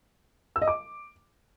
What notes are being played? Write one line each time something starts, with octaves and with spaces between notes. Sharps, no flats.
E6
D#5
D6